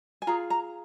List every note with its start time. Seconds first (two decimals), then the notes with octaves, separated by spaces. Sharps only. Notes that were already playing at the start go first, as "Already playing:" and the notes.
0.22 G#5
0.27 F4 G#4 A#5
0.50 A#5